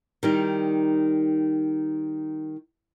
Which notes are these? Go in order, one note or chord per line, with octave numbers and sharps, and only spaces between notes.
D#3 G3 D#4